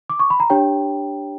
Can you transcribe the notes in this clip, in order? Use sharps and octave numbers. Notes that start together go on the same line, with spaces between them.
D6
C#6
B5
A#5
D4 G4 C#5 G5